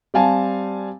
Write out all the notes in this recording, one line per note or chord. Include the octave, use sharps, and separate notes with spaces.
G3 C4 F5 G#5 A5